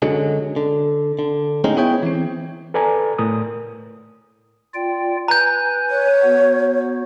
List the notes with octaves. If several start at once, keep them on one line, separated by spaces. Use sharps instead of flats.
F#2 D3 F#3 G#3
D3
D3
A2 G#3 C4 C#4 D#4
B3 E4 G#4 C#5 G5
E3 C4
A4 B4 D5 G#5 A#5
A2 A#4 D#6
F4 D5 G5
B4 G#5 A#5 G6
C#5
B3 F#4